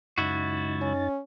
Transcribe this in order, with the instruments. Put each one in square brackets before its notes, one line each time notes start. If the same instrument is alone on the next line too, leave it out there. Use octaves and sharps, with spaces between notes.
[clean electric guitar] C#2 E4 F#4 [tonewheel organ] F#2 D#4 A6
[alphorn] C#4